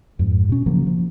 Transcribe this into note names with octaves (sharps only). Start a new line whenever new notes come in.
F2 G#2
B2 C#4
C#3 F3 F#3 A#3
F3